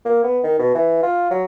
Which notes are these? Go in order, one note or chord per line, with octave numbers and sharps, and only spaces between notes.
A#3
B3
D#3
B2
E3
F4
F#3